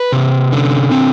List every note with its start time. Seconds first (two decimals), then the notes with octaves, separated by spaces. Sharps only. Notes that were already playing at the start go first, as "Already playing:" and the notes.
Already playing: B4
0.12 C3
0.52 D3
0.91 C4